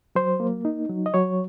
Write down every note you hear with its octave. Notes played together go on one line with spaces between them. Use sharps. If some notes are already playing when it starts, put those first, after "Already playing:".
F#3 C5
A#3
D#4
F#3
D#5
F#3 C#5